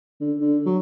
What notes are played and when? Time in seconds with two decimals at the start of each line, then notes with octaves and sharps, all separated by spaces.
0.21 D3
0.41 D3
0.66 F#3